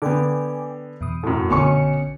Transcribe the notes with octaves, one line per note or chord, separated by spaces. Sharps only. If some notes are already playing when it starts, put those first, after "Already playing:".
D3 B3 G5 G#5 D6
E2 B2 D#6
F#2 A2
A#1 B2 D3 C#4 C#6 C#7